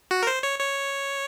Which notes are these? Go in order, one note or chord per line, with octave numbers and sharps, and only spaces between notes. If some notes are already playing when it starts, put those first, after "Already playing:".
F#4
A#4
C5
C#5
C#5